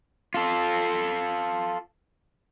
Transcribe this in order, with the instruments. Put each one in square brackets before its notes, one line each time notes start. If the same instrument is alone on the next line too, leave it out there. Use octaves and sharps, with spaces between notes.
[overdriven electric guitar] F4 A4